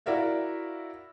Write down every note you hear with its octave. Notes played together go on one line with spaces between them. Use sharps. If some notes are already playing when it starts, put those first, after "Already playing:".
E4 F#4 A#4 D5 E5 F5